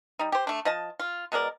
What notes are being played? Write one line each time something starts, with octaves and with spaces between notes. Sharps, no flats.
G3 D#4
G4 C5
A3 D4
F3 D#5 A5
F4
B2 G#3 A#4 D5